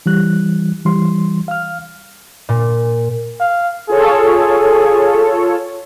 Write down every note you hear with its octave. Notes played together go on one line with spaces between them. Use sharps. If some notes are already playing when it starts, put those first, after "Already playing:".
E3 G3 F#6
E3 G3 C6
F5 F6
A#2
F5
F4 G#4 A4 C#5